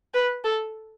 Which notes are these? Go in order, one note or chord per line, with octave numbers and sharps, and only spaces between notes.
B4
A4